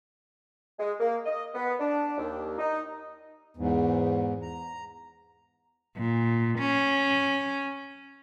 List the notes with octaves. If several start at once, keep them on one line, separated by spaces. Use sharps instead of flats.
G#3
A#3
D#5
B3
D4
D#2
D#4
E2 G#2
A#5
A#2
C#4